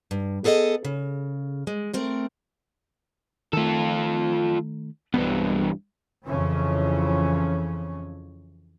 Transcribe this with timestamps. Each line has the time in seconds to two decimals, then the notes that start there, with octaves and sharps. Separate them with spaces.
0.11 G2
0.44 B3 G#4 A4 C#5 D#5
0.85 C#3
1.67 G#3
1.93 A3 C4 A#4
3.53 D#3 A3 F4 A4
5.14 B1 G2 E3 G3 B3
6.27 F2 C#3 E3 C#4